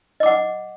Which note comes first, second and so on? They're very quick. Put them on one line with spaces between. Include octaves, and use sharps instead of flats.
D#5 D6 F#5